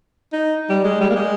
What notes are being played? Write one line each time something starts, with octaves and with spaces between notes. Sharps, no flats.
D#4
G3
G#3
G3
A#3
G#3